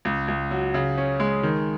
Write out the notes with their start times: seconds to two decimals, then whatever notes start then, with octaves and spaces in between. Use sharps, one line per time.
0.05 C#2
0.28 C#2
0.51 F#3
0.74 C#3
0.98 C#4
1.20 G#3
1.43 D#3